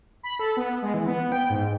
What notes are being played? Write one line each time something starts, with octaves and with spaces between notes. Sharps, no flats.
B5
A4
B3
G#3
E3
B3
G5
G#2